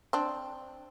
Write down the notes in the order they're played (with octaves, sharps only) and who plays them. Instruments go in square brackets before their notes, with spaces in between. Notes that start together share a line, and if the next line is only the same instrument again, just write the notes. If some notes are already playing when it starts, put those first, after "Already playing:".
[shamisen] C4 D4